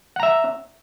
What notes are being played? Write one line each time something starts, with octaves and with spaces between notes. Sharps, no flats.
E5 F#5 A#5